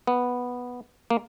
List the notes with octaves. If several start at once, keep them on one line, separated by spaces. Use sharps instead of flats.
B3
A#3